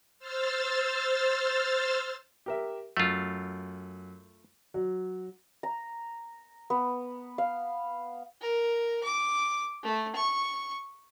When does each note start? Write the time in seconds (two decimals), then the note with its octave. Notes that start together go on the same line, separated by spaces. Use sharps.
0.19 C5 E6 F6 A6
2.46 G4 A#4 E5
2.97 F#2 A3 F4
4.74 F#3
5.63 A#5
6.70 B3
7.38 F5
8.41 A#4
9.03 D6
9.83 A3
10.15 C#6